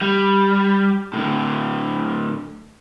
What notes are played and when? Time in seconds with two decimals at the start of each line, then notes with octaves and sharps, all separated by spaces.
0.01 G3
1.14 A2 D3